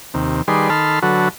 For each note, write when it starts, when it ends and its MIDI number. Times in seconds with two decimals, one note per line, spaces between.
0.14 0.42 39
0.14 0.42 48
0.48 0.70 51
0.48 0.70 55
0.48 0.70 68
0.48 0.70 71
0.48 0.70 74
0.48 0.70 84
0.70 0.99 51
0.70 0.99 69
0.70 0.99 81
0.70 0.99 83
0.70 0.99 84
0.70 0.99 89
1.02 1.29 50
1.02 1.29 54
1.02 1.29 66
1.02 1.29 69
1.02 1.29 71